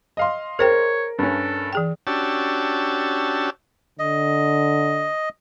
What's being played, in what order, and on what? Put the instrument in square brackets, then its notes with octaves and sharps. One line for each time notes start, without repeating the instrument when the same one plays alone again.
[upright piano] D#5 F5 C6
[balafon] G#4 C5 G5 [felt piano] A#4 [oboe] C#5
[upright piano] G2 C#4 [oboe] A4
[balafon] E3 G#4 G5
[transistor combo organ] C#4 D4 F#4 G4 A5 E6
[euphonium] D3 [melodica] D#5